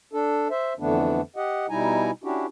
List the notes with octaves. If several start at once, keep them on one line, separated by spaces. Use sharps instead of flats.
D4 A4
C5 E5
F2 D3 E3 A3 B3 D4
G4 D#5 F#5
B2 G3 D#4 E4 G#5 A#5
C#4 D4 E4 F#4 G4